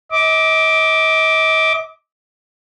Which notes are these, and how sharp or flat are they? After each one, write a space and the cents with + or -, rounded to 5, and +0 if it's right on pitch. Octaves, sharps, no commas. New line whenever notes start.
D#5 +40 D6 +0